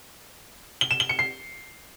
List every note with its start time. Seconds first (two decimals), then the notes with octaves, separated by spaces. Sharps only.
0.81 G7
0.91 E7
1.00 G7
1.09 C#7
1.19 C7